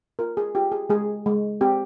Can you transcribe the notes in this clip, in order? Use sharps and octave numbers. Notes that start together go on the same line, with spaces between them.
F4 A#4
G#4
F4 G4
G#4
G#3 G#4
G#3
C4 G4